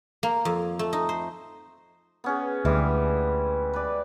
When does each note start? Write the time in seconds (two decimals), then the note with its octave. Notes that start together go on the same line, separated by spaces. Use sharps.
0.23 A#3
0.45 F2
0.79 A3
0.93 D#4
1.09 C5
2.24 B3 C#4 G#4
2.65 D2 E3 G3 G#3
3.74 B4 D5